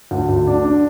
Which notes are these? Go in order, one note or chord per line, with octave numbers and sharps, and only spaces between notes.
D2
D2
D4
D4